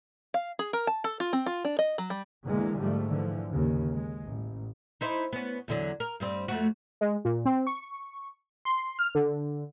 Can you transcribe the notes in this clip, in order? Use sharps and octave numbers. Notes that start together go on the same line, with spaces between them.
F5
G#4
A#4
A5
A4
F4
C4
F4
D4
D#5
F#3
G3
E2 D3 E3 G#3 A#3
G#2 F3 G3 A3
D3 E3 F3
D#2 C#3
G#3
A1
D#4 E4 C5
B3 C#4
E2 D3 F#3
A#4
G2 G3 C4
F2 A3 F#4
G#3
A#2
C4
C#6
C6
F6
D3